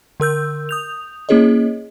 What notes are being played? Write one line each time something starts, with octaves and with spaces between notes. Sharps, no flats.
D3 A#4 E6 G6
D#6 G6 F7
A#3 C#4 E4 G#4 C#5 D#5